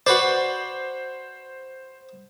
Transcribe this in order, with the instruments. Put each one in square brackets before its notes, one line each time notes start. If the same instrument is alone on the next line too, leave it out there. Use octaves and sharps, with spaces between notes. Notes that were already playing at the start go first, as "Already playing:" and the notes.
[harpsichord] F#4 B4 D5 [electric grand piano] C5